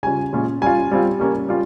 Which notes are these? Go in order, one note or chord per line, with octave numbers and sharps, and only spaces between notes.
C#3 G3 C#4 F4 G#5
A#2 G#3 C#4 F4
G3 C#4 F4 G#5
G3 C4 F4
G3 A#3 C#4
G3 C#4 F4